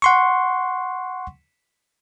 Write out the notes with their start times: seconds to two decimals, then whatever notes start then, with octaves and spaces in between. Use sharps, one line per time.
0.02 F#5 C6 C#6